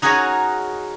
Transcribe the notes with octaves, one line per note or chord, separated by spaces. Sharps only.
D#4 F#4 G#4 A#4 C#5 D#5